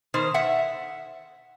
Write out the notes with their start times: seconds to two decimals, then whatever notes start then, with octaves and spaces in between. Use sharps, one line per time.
0.14 B2 D#3 C5
0.34 E5 F#5